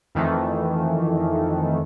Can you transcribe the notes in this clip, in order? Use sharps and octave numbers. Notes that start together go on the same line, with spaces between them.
F2 D#3 E3 A3